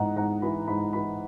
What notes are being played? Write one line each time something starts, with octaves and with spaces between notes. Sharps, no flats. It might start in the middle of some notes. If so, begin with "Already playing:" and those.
Already playing: G#2 E3 D#5 F#5 A#5
G#2 F#5 A#5
E3 B5
G#2 B5
E3 B5